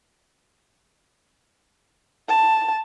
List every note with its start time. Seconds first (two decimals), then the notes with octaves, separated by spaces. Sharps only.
2.28 A5